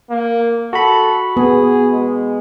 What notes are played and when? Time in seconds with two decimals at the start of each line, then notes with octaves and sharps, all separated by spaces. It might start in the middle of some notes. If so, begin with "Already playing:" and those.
0.10 A#3
0.73 F#4 A4 B5
1.37 B3 G#4
1.92 G#3